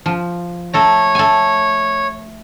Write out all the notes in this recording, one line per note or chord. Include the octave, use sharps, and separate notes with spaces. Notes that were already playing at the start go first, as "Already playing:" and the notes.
F3
A3 A4 C#5 A#5
A3 G#5